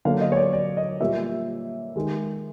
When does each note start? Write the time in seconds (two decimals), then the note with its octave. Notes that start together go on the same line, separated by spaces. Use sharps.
0.05 D3 F#3 A#3 F5
0.21 D#5
0.32 C#5
0.37 D5
0.53 D5
0.77 D#5
1.00 A#2 G3 A#3 E5
1.96 D#3 G#3